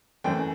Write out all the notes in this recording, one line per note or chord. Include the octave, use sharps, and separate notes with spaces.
F#2 E3 A3 G5